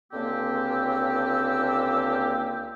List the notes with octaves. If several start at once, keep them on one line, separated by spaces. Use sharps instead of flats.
C#2 D3 A#3 C4 G4 E6